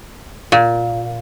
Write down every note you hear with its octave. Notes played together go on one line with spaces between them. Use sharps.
A#2